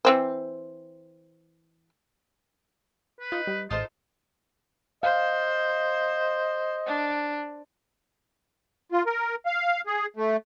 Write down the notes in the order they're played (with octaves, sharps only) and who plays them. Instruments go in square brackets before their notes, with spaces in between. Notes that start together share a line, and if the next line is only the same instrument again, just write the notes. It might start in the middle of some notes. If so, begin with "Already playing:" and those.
[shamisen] E3 C4 C5
[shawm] B4
[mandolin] D#4 [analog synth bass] F4
[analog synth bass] G3
[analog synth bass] A1 [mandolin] D#4 A4 C5 [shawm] F4
[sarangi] C5 [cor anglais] D#5 [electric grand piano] F5
[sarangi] D4
[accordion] F4
A#4
F5
G#4
A3